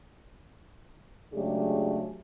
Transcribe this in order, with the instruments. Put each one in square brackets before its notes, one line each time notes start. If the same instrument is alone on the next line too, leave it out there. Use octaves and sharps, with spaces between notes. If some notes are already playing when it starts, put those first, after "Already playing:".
[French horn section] C#3 F#3 G#3 A3 D4 G4